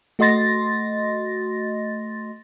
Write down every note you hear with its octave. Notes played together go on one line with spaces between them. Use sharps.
A3 F#4 D#5 C6 A6 A#6